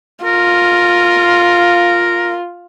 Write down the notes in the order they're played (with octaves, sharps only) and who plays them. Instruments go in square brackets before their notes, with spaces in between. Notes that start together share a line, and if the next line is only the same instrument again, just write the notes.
[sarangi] F4 [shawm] A#4